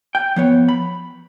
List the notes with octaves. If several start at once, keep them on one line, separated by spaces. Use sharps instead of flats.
G5
F3 B3 C#5
B5